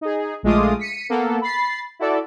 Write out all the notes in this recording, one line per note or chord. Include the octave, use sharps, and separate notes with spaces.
D#4 G#4
A#1 G#3 A3 F4 D6 D#6
B6 C#7 D#7
A#3 B3 A4 F#5
B5 A6 C7
E4 F#4 A4 D5